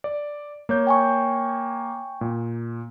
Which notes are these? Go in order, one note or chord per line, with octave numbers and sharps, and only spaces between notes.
D5
A#3 C#5 G6
G5 G#5 C#6
A#2